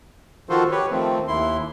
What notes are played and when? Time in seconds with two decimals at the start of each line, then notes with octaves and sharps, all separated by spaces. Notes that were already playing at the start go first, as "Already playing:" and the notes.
0.49 D#3 F3 F4 F#4 A4 C5
0.71 G4 B4 C#5
0.91 D#3 F3 A3 C4
1.28 D#2 E4 C6